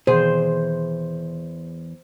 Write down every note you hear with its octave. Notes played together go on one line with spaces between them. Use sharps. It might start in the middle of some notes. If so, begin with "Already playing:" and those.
E2 B2 D#3 E3 G#4 C5